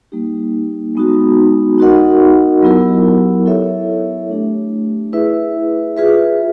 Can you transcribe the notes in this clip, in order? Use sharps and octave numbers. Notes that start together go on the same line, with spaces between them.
G3 A#3 D#4 G4
G#3 B3 D#4 F#4
D#4 F#4 A#4 D#5 F#5
F#3 B3 E4 G4 A#4
E4 A4 C#5 E5
A3 D4 G4
E4 G#4 B4 E5
F4 G#4 B4 E5